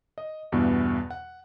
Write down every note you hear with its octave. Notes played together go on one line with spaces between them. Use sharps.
D#5
E2 G2 B2 E3
F#5